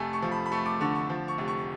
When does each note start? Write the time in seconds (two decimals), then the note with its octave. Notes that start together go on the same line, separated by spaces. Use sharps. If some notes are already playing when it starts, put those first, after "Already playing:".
Already playing: F1 A3 G#5
0.13 C#6
0.22 F3
0.32 B5
0.46 B5
0.52 A3 C#6
0.66 D6
0.81 D3 C#6
0.95 C#6
1.10 F3
1.28 C#6
1.38 F1
1.48 C#6